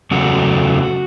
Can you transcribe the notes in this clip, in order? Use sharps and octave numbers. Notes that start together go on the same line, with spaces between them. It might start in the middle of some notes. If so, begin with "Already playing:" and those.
E2 C#3 F#3 A3 F#4